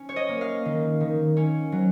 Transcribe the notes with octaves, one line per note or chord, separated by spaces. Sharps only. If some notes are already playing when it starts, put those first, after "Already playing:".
Already playing: C#4
C#5
D#5
A#3
F5
D#3
D#3
C#4
F#3